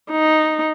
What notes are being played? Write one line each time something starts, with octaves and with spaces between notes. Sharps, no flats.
D#4